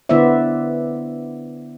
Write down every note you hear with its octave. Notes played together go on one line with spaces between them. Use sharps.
D3 B3 E4 C5 D5 E5